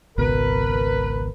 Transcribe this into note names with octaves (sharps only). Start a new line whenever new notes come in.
G#1 C#2 B2 A#4 B4